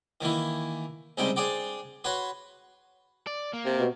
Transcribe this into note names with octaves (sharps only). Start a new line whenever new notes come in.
D#3 E3 A#3 E4
C#2 C3 G3 G#3 D#4 G5
D4 G#4 C5 D5 G5
F#4 B4 C#5 C6
D5
A#3
C3
B2